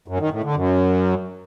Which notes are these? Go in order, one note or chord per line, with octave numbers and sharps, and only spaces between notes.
F#2
D#3
A2
D3
F#2